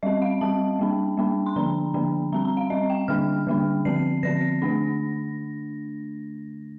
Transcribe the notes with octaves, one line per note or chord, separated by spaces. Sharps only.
G3 C4 D#5
F5
G3 C4 A5
G3 A#3 D4
G3 A#3 D4
C6
D3 F3 A#3 D4 A#5
D3 F3 A#3 D4
G3 C4 A#5
A#5
F5
G3 C4 D#5
G5
D3 G3 A#3 D4 F6
D3 G3 A#3 D4
D3 F3 C4 C7
D3 F3 C4 A#6
D3 A3 D4